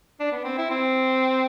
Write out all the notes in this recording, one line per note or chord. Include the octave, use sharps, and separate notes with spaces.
D4
B3
C4
E4
C4